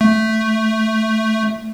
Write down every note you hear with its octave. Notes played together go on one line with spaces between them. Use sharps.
A3